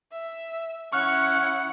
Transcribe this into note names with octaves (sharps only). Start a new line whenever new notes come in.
E5
C#4 E4 F#5 C#6 F6 F#6